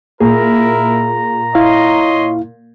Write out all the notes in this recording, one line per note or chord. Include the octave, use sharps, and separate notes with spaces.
A#2 E4 G#4 A#4 A#5
E4 C#5 D#5 F5 C6